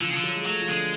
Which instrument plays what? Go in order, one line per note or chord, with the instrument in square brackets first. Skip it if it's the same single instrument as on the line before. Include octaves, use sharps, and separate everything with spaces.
[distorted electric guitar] D3 [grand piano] F3
[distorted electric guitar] C#3
[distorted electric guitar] D3 [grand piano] F3
[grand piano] F#3
G#3
[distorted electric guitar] F#3 [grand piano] A3
[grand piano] F3
[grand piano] D3 [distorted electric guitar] G#3